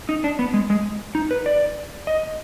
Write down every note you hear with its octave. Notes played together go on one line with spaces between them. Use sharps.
D#4
D4
B3
G#3
G#3
D#4
B4
D5
D#5